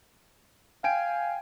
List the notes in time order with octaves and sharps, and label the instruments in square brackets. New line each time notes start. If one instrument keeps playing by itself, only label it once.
[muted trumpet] F5 [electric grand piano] G5 G#5 D7